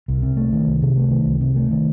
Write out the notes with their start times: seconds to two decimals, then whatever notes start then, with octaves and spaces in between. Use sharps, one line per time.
0.08 C2
0.22 C3
0.37 A3
0.53 D#3
0.67 C2
0.82 C3
0.97 A3
1.11 D#3
1.26 C2
1.41 C3
1.56 A3
1.71 D#3